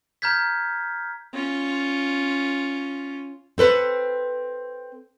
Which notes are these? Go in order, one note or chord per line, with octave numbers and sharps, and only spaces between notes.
A#5 F6 G6 G#6 B6
C#4 F4
C4 A4 B4 C5